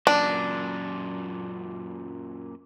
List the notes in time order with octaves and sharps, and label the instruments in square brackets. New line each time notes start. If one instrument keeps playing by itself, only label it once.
[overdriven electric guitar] F#2 A#2 [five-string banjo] D4